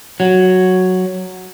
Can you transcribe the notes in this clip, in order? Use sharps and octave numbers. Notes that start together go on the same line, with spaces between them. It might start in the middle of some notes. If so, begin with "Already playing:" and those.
F#3